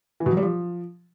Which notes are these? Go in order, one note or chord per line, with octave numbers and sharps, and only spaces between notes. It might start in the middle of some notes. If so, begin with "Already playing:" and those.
E3
B2
F#3
G3
F3